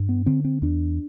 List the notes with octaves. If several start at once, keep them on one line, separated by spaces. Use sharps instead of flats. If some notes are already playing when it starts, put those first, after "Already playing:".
Already playing: G2
B3
D3 C4
C4
E2 D4